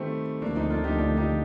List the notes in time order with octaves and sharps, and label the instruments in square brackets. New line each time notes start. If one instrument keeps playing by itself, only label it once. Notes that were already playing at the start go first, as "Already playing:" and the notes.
Already playing: [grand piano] D#3 G3 A3 C4
[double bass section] D2 D3 F3 A3 [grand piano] A#3 D4
[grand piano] C4 D#4
D4 F4
D#4 G4
D4 F4
D#4 G4